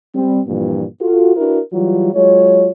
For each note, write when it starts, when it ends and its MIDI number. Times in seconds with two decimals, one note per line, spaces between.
0.14 0.40 55
0.14 0.40 60
0.47 0.84 43
0.47 0.84 46
0.47 0.84 52
0.47 0.84 53
0.47 0.84 58
1.01 1.34 65
1.01 1.34 66
1.01 1.34 69
1.37 1.60 62
1.37 1.60 64
1.37 1.60 66
1.37 1.60 70
1.37 1.60 71
1.73 2.14 52
1.73 2.14 54
1.73 2.14 55
1.73 2.14 65
2.15 2.70 54
2.15 2.70 56
2.15 2.70 65
2.15 2.70 73